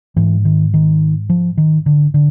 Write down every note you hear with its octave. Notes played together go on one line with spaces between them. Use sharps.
G#2 E3
D#3
D#3
F3
D#3
D3
D3